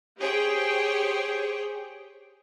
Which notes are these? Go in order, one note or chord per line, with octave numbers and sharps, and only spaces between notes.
G4 G#4 C5 C#5 G5